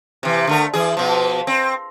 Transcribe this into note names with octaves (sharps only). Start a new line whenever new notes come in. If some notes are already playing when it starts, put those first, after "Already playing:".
C3 E3
D3 A3 A#4
E3 G#4
B2 F3
C4